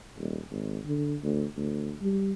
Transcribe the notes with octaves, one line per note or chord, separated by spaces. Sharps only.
D#1
G#1
D3
D2
D2
G3